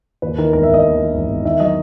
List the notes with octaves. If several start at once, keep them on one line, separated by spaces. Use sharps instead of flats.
D#2 B4
D#3 A#4
E1 A#4
E5
E1
D#5
D#2
D#3
E1
E1
D#3 E5
F#3 D#5